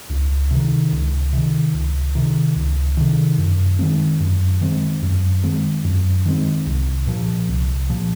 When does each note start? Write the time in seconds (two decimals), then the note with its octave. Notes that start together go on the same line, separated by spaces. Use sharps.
0.10 C#2
0.51 C3 D#3
0.92 C#2
1.33 C3 D#3
1.74 C#2
2.15 C3 D#3
2.56 C#2
2.97 C3 D#3
3.38 F#2
3.79 D#3 G#3 C4
4.20 F#2
4.61 D#3 G#3 C4
5.03 F#2
5.43 D#3 G#3 C4
5.85 F#2
6.26 D#3 G#3 C4
6.66 C2
7.07 A#2 F3
7.49 C2
7.90 A#2 F3